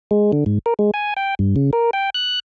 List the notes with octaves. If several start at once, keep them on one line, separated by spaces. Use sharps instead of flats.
G#3
D3
G#2
A#4
G#3
G#5
G5
G2
C#3
A#4
G5
F#6